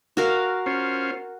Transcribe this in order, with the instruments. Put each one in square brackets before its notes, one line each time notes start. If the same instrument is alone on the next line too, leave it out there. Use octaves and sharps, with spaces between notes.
[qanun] F#4 A#4 F5
[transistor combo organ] C#4 F4 C5